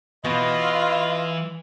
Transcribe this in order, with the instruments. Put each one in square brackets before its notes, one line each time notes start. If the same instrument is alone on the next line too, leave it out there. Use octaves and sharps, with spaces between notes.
[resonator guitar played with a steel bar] B2 B3 [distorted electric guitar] E3 [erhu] F4 [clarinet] D#5